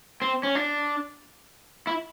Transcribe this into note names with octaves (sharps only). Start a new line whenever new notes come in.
C4
C#4
D4
E4